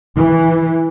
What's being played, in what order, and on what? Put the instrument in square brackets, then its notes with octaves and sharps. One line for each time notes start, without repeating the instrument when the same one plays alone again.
[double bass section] E3